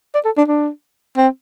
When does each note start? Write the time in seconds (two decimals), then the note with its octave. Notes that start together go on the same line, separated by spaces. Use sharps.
0.15 D5
0.25 A4
0.38 D4
0.48 D4
1.17 C4